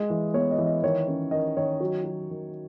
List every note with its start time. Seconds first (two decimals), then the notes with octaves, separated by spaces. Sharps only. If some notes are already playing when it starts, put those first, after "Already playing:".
Already playing: G#3 D#5
0.10 E3
0.34 B3 C#5
0.51 D#5
0.58 E3
0.66 D#5
0.83 D#3 C#5
1.08 C#4
1.31 D#3 D#5
1.57 D#3 C#5
1.80 F#3
2.04 F#3
2.30 D#3